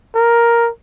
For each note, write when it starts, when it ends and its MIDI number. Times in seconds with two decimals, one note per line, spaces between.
0.15 0.70 70